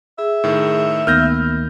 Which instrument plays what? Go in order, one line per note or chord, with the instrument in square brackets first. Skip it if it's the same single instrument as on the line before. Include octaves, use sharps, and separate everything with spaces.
[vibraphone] G#4 [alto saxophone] E5
[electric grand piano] A2 D#3
[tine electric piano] D2 D#3 A#3 [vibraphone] B3 [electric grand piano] F6 G6 A#6